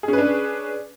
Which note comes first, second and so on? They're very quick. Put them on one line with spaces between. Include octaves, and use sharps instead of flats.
G#4 C#4 B4 D4